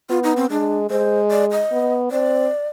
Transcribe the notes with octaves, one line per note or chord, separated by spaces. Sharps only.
B3 F4
D#4
C4
G#3 D4
G#3 C5
D5
D#5
B3
C4 D5